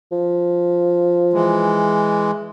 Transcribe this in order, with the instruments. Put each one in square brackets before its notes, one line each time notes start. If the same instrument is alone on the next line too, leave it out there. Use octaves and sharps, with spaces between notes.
[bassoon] F3
[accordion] E3 G#3